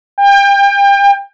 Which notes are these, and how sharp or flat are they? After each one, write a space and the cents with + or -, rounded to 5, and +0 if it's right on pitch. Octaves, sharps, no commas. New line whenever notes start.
G5 +30